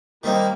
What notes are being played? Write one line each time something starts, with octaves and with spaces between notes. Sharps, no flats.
D#3 G3 A#3 C4 D#4